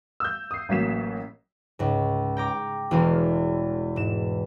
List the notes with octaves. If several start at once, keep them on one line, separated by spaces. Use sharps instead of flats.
E6 G6
D#6 C7
A1 F#3 A#3 B6 E7
C#2 G#2
G5 A#5 D6
E1 E2 E3 G#3 F5
G#2 E7